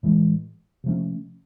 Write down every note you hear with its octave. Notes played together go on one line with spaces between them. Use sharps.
A2 E3 G#3
C3 F3 A3 C#4